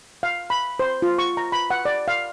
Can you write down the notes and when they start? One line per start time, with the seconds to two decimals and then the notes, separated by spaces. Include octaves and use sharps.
0.23 F5
0.50 B5
0.79 C5
1.02 F4
1.18 C#6
1.37 A#5
1.52 B5
1.70 F#5
1.85 D5
2.08 F5